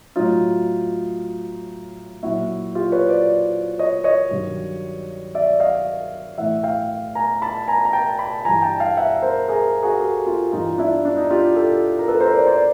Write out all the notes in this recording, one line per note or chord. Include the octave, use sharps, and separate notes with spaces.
A2 F#3 D#4 F4
A#2 F#3 E4 F#4
F4 G4
B4 C#5
C5 D5
C#5 D#5
C#5 D#5
G2 D#3 F#3
D5 E5
D#5 F5
A2 E3 E5 F#5
F5 G5
G#5 A#5
A5 B5
G#5 A#5
A#5
G5 A5
A5 B5
G2 E3 G#5 A#5
G5 A5
F5 G5
E5 F#5
A#4 C5
G#4 A#4
F#4 G#4
G4 A4
F4 G4
G2 E3 D#4 F4
D4 E4
D4
D#4
F4 G4
G4 A4
A#4
A4 B4
A#4 C5
C5 D5
C5 D5